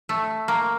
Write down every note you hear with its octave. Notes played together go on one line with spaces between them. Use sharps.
A3
A#3